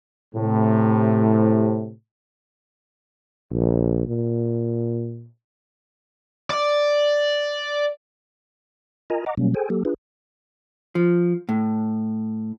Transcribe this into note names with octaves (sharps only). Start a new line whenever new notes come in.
A2 C3
A#1
A#2
D5
F4 A#4 D#5 G#5 A#5
D#5 F#5 A#5 D6
B2 F#3 G3 A#3 C#4
G#4 A4 C5 G5 G#5
F#3 A#3 G4 A4
D4 F4 G#4 B4
F3
A2